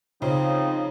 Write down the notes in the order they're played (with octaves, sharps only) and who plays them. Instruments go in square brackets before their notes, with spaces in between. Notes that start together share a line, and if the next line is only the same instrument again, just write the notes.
[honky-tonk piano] C#3 [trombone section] F3 D#4 [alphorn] C4